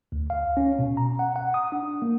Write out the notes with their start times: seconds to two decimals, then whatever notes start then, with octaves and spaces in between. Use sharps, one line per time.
0.12 D2
0.30 F5
0.57 C#4
0.79 B2
0.97 A#5
1.19 F#5
1.36 F#5
1.54 D#6
1.72 D4
2.02 A#3